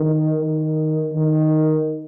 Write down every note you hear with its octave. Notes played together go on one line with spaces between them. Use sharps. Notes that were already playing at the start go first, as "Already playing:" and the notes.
Already playing: D#3
D#3
D#3